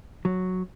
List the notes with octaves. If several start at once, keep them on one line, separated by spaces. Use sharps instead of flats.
F#3